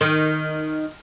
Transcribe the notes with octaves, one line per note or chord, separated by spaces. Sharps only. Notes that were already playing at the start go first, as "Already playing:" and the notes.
D#3